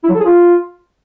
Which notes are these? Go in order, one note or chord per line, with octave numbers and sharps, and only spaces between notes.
E4
F#3
A4
G#4
F4